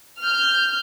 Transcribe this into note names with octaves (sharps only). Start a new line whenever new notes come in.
F6 G6